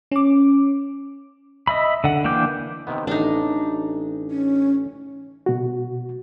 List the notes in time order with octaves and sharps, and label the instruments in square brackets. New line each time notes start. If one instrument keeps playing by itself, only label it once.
[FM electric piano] C#4 D6
[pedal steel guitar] D#5 E5 B5
D3 F#5
E3 A#3 D4 G5 D6
[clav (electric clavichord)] C3 D#3 B3
[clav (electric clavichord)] A1 [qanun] D4 D#4
[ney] C#4
[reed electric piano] B2 F#4